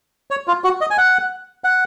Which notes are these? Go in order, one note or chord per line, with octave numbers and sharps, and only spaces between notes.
C#5
F4
F#4
D#5
G#5
F#5
F#5